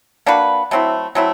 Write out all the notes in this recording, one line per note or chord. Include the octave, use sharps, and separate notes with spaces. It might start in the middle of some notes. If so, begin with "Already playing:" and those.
A#3 D4 F#4 B4
F#3 A3 C4 E4
F#3 A3 C4 E4